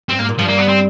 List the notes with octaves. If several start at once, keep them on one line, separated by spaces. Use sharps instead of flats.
G2 C4
G#2 A#3
A#2
G2 F3
A#3
B3
C4